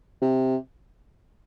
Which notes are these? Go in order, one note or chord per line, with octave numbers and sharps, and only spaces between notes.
C3